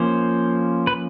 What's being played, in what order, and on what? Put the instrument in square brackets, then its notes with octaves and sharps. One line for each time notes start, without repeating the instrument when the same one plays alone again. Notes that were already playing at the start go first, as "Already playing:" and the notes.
Already playing: [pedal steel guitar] F3 A#3 C#4 C5
B4